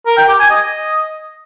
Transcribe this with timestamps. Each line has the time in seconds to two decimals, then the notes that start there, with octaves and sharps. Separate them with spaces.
0.06 A#4
0.17 G5
0.28 G4
0.39 G#5
0.50 D#5